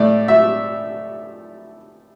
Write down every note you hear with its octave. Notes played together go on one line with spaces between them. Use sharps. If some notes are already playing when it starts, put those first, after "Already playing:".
Already playing: A2 A3 D5
E5